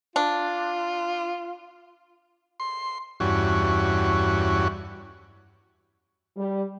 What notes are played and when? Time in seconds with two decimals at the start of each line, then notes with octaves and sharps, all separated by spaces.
0.16 D4 F4
2.60 C6
3.20 E2 G2 C#4 F#4
6.37 G3